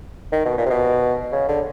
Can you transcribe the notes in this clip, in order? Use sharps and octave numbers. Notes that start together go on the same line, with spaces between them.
D#3
B2
A#2
C3
B2
C#3
D3